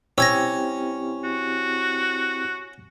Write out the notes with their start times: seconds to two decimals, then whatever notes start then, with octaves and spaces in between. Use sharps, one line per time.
0.18 C4 C#4 E4 G4 E6 G#6 A#6
1.24 F#4